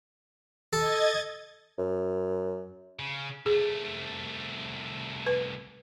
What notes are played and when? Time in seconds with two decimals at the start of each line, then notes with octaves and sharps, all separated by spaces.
0.73 A4 D#5 G#6 A6
1.78 F#2
2.99 C#3
3.46 C2 A3 G#4
5.26 B4